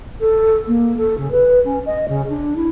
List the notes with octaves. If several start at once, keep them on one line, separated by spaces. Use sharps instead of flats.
A4
A#3
A4
C#3
B4
C#4
D#5
C#3
D4
E4